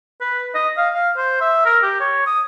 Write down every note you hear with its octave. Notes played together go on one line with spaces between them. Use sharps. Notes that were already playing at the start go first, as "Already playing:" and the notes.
B4
D#5
F5
F5
C5
E5
A#4
G4
C#5
D#6